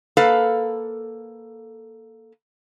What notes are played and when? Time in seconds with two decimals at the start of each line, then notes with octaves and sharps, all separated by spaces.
0.17 A#3 A4 B4 F5